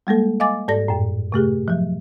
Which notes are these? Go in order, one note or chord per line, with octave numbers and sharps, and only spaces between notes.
G3 G#3 A#3 A4
D#5 F5 G#5 D6 A6
G#2 A4 D5 A#6
F#2 A2
C3 A3 G4 G#4
F3 F#3